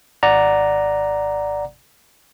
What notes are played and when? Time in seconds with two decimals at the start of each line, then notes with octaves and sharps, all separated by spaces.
0.23 G#1 D5 F#5 A#5